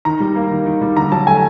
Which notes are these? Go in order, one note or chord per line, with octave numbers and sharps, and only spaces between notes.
D#3 A#5
G3
A#3
D#3
D#3
G3
D3 A#5
F#3 A5
A3 G#5